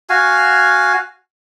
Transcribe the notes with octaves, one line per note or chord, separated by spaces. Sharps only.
F#4 F5 G#5